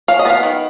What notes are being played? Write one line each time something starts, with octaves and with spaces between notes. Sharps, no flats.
F#3 F5
D#5
B3 F5
D#3